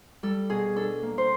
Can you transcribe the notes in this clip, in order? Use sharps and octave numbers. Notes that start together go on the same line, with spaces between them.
G3 A4
B2 G#4
D4 A4
A#3
C5